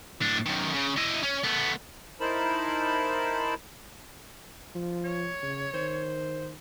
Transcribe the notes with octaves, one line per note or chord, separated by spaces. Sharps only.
A2 D4
F#2 D#3
C#3
E4 D#5
C#4
A3 B3
D#4 E4 A#4 C5 A5 B5
F3
C#5
C#3
D#3 C5